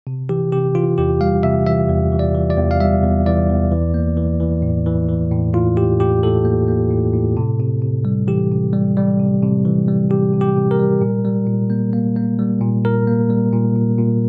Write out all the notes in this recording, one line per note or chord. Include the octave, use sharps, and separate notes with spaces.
C3
E3 G4
C3 G4
E3 F4
E2 G4
G3 F5
C3 E5
E3 E5
E2
E3
D5
E3
D5
E2
F5
G3 E5
E2
E3 D5
E2
E3
A#3
E3
E3
A2
E3
E3
A2
A2 F4
A2 G4
A2 G4
A2 A4
A#3
A#3
A2
A2
C3
C3
C3
G3
E3 G4
C3
G3
G3
C3
C3
E3
G3
C3 G4
C3
G4
C3
A#4
G3
A#2
G3
A#2
A#3
A#3
A#3
G3
A#2
A#2 A#4
A#3
G3
A#2
A#2
A#2